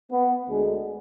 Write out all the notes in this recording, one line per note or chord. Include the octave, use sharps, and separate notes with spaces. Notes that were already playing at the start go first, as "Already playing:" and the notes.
B3
D2 D3 G#3